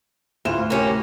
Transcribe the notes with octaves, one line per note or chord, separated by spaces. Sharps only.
D2 A2 F4 E7
A#3 C#4 G4